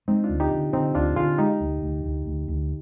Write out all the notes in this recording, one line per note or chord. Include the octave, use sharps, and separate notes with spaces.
G#3 C4 D#4
D4 F4
D2
D#4 G4
D3
D3 C4 D#4
D2 D4 F4
D3 F4 G#4
G#3 D#4 G4
D2
D2
D2
D2
D2